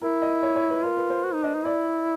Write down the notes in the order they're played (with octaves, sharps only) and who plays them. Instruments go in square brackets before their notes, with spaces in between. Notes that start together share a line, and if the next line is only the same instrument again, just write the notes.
[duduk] E4 [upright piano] A#4
[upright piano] D#5
C#5
C#5
B4
[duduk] F4 [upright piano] A#4
[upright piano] B4
C5
[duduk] F#4
D#4
[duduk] D4 [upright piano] D#5
[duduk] D#4
[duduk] E4 [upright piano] D5